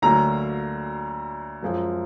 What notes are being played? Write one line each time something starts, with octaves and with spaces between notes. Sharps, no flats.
D2 D3 F#3 A#3 A#5
F#2 F3 G#3